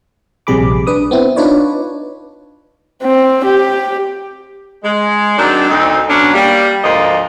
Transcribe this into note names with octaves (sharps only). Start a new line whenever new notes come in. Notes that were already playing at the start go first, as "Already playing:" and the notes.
A#1 C3 G3 G#4 B5 D6
D4 B4 D#6
B3 C4 E4
D4 D#4 F4 B4 C#5 D5
C4
G4
G#3
D#3 F#3 C4 D4
D2 C4 D#4
B2 F#3 C#4 D4
G3 A#3
D2 G#2 F3 A#3 D5 D#5